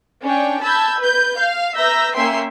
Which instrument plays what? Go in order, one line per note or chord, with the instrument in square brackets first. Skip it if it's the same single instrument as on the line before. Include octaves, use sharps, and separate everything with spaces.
[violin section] C#4 D4 G5
A5 B5 E6 G6 G#6
B4 G6
F5
B4 E5 A#5 E6 G6 A#6
A#3 C#4 E5 G5 C6 C7